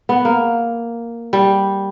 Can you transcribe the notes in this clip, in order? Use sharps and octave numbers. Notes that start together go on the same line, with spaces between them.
B3
A#3
G3